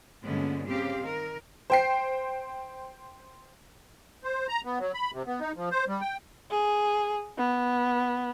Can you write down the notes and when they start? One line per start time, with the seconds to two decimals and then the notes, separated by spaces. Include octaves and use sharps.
0.24 G2 A#2 D3 G#3 B3 C#4
0.67 C#3 C4 G4 F5
1.01 D#3 A#4
1.70 C5 G5 C7
4.24 C5
4.48 A#5
4.65 B3
4.79 F#3
4.94 B5
5.13 C3
5.27 B3
5.40 D#4
5.56 F3
5.71 C5
5.88 G3
6.01 G5
6.51 G#4
7.38 B3